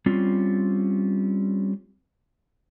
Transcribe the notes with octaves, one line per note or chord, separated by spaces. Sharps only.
G3 C4 C#4 F4